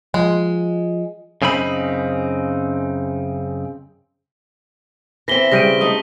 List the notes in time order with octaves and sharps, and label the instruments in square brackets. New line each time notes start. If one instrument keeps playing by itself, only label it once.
[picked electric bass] F3 [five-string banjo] G#3
[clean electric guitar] F#2 C#3 C4 D#4 B5
[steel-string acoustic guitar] E3 C4 [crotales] A#6 B6 G7
[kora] C#3 G3 G5 [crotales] A#6 D#7
[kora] A3 D#4 [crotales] D#6